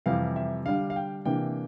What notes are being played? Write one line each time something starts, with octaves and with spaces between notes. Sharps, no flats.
F2 C3 E3 G3 F5
E5
D3 G3 D4 F5
F5
G5
C3 E3 A#3 D4 G5